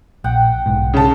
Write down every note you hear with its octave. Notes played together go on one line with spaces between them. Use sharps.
A#1 F#5 G5
B1 G#2
C#3 A5